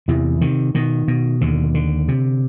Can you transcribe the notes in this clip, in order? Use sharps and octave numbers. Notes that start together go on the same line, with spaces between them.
E2 C3 E3
C3 D#3
B2 D#3
B2
D#2 D3
D3
C3